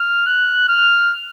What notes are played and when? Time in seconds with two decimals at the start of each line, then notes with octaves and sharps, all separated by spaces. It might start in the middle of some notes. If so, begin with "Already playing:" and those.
Already playing: F6
0.26 F#6
0.69 F6